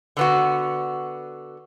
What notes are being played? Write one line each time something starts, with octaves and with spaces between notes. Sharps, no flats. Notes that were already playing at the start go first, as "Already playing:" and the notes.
D3 B3 F#4